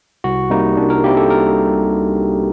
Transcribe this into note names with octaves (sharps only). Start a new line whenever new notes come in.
C2 F#4
C3 G3 A#3 D#4
C2 D4
A#4
C3 G3 A#3 G4
A4
A#4